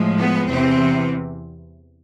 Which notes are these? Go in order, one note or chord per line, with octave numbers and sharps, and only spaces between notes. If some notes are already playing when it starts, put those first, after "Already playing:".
Already playing: A2 F3 G#3
B3
E2 C3 E3 C4